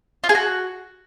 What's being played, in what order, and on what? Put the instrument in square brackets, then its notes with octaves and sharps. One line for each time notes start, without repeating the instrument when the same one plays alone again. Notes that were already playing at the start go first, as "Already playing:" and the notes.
[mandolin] F4
G#4
F#4